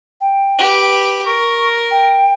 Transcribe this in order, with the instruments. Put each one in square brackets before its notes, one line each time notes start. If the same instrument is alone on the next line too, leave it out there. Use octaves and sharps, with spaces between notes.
[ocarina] G5
[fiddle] G4 B4
[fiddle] A#4 [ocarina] C#6
[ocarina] G5